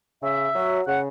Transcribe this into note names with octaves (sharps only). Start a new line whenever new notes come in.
C#3 E5
F#3
C#3 F#5